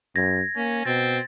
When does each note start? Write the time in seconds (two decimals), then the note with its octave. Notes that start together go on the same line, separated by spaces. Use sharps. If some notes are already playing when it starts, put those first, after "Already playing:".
0.16 F#2 G#6 A#6
0.56 A#3 C#4
0.85 B2 C4 A6